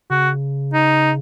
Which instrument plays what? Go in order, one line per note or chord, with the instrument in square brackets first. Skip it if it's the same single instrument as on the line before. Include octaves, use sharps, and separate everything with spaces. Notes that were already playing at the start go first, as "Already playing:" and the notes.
[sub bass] C#3 [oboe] F#4
[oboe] D#4